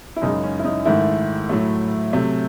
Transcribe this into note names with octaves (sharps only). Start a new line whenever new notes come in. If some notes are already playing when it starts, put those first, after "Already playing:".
E4
F#2 C#3 G#3 D#4
C#4
E4
D#4
G#2 D#3 A3 E4
A2 F#3 A3
C3 F#3 A3